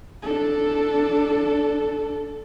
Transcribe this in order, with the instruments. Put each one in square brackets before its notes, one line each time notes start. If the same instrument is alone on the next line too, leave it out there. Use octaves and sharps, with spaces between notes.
[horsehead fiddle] D4 A4